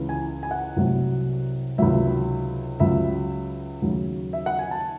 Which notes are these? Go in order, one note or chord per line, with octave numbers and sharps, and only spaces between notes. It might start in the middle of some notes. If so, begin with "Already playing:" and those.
Already playing: C#2 C#3 E3
G#5
G#5
F#5
C2 C3 F#3
C#2 C3 D#3 F#3 E5
C#2 C#3 F#3 E5
D#2 C#3 F#3
E5
F#5
G#5
A5